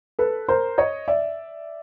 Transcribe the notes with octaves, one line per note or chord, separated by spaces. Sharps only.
A4 B4
A#4 C5
C#5 D#5
D5 E5